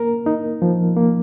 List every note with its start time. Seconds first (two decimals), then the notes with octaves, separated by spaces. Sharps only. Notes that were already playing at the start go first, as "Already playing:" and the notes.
Already playing: A#3 A#4
0.26 D#4
0.62 F3
0.97 A#3